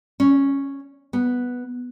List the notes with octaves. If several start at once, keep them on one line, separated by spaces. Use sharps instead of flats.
C#4
B3